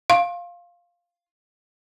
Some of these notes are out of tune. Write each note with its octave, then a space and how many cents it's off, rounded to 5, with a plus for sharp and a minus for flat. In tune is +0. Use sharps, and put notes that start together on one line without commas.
F5 +0 C6 +40